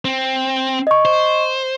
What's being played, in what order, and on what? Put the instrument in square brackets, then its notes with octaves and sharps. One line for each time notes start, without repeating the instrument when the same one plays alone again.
[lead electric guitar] C4
[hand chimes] D#5 C#6
[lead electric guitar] C5